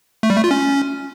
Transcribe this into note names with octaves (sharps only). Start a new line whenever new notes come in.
A3
G3
A3
F4
C#4